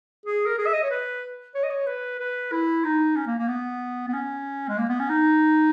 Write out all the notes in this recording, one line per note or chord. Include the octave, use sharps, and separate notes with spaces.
G#4
A#4
G#4
E5
D#5
C#5
B4
C#5
D#5
C#5
B4
B4
E4
D#4
C#4
A#3
A#3
B3
B3
C#4
G#3
A#3
B3
C#4
D#4